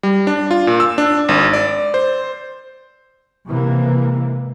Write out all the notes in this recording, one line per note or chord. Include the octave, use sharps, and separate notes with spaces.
G3
D4
F4
A#2
E6
D4
G#1
D5
C5
C3 E3 G#3 A#3